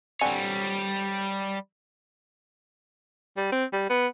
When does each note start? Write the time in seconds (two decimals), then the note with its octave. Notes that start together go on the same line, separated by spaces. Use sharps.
0.21 D3 G3 C4 C#5 G#5
3.37 G3
3.52 C4
3.73 G3
3.90 B3